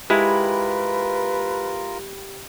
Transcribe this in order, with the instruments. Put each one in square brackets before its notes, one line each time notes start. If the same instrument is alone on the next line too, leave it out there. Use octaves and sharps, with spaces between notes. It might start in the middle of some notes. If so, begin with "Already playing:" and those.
[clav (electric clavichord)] G#3 E4 [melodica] F4 A#4 [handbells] G4 G5 B5 [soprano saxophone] B4